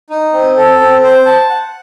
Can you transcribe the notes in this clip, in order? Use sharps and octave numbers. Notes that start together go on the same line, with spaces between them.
D#4
C4
A4
C4
C5
A5
F#5